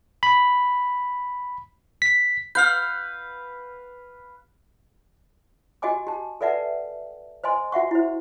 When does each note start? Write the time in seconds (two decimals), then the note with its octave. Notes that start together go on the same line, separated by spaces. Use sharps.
0.23 B5
2.02 B6
2.55 B4 F5 F6 G6
5.82 F#4 G4 D#5 G5 G#5 D6
6.07 G4 A5
6.41 A4 B4 D5 E5 F#5 A5
7.44 C5 D#5 G#5 C6
7.72 F#4 E5 F#5 C#6
7.91 E4 C5